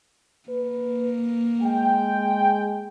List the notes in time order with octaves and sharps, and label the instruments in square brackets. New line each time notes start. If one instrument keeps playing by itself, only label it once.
[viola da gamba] A#3 [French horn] B4
[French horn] G#3 [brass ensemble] G5